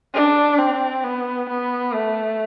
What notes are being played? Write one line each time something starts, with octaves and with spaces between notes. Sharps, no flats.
D4
C4
B3
B3
A3